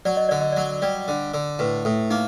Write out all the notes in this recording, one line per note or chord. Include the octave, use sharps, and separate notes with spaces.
F#3 D5
D#5
D3 D5
D#5
F#3 D5
G3 D5
D3
D3
A2 B4
A2 A4
A#3 D#4